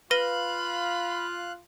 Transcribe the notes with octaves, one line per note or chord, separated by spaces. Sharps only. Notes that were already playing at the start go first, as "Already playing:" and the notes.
F4 B4 F5 B5 F#6 A#6 D#7